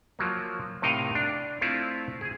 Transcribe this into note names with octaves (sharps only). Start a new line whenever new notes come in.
F3 F#3 A#3
A2 C3 D#4 A#4 D#5 F5
D4
A3 C4 E4 F4
G#4 G#5